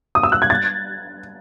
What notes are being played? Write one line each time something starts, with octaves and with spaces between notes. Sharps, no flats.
D#6
E6
F#6
G#6
A6